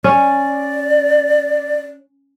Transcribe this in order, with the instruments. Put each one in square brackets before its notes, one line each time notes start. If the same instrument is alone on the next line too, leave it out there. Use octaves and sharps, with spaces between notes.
[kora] C#4 [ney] D5